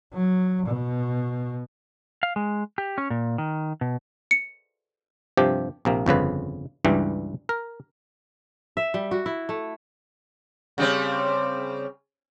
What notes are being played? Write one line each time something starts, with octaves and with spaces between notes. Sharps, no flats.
F#3
B2
F5
G#3
G4
C#4
A#2
D#3
B2
C#7
G2 C3 F3 G4
A#1 C3 A#3
G1 F2 C#3 B4
C#2 G2 E3 G3
A#4
E5
G3
F#4
E4
A3
C#3 G3 C4